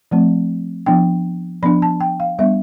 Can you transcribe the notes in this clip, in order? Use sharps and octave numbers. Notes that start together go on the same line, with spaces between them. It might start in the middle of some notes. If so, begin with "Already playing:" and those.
F3 A3 C4
F3 B3 D4 G5
F3 B3 D4 B5
A5
G5
F5
G3 B3 D4 E5